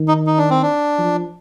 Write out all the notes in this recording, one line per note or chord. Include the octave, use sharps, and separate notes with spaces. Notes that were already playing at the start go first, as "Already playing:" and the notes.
Already playing: D#3
D#4
D#4
D4
C4
D4
F3